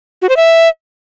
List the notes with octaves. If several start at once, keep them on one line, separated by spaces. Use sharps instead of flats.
F#4
C5
E5